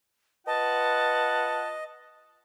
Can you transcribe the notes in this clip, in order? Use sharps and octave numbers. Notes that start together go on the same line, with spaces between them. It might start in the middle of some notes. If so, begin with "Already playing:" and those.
F4 B4 D#5 F#5 A5